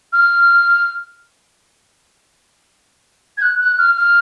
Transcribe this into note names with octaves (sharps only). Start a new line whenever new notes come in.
F6
G#6
F#6
F#6
F6
F6